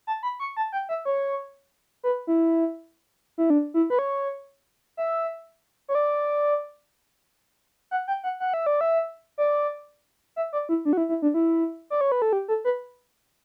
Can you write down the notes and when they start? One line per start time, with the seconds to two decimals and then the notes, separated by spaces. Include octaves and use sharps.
0.07 A5
0.23 B5
0.40 C#6
0.57 A5
0.73 G5
0.89 E5
1.05 C#5
2.03 B4
2.27 E4
3.38 E4
3.50 D4
3.74 E4
3.90 B4
3.99 C#5
4.97 E5
5.88 C#5
5.95 D5
7.91 F#5
8.08 G5
8.24 F#5
8.40 F#5
8.54 E5
8.66 D5
8.81 E5
9.38 D5
10.36 E5
10.53 D5
10.69 E4
10.85 D4
10.93 F#4
10.97 E4
11.09 E4
11.22 D4
11.34 E4
11.90 D5
12.01 C#5
12.12 B4
12.22 A4
12.33 G4
12.48 A4
12.65 B4